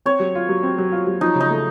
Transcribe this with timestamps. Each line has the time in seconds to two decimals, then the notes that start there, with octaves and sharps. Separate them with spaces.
0.06 C4 C#5
0.20 F#3
0.35 F4
0.49 F#3
0.63 C4
0.78 F#3
0.92 F4
1.07 F#3
1.21 F3 D#4
1.36 C#3 D#4
1.50 A3